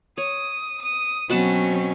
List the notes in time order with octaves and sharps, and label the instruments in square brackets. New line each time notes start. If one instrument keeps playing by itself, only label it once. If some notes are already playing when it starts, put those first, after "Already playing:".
[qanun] C#5 [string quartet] D#6
[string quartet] D#6
[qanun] B2 F#5 A5 [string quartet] F#3 C4 C#4